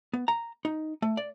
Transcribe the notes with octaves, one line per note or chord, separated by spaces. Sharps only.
B3
A#5
D#4
A3
D5